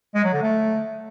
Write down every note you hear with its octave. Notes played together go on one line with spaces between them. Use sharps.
G#3
F#3
D3
A3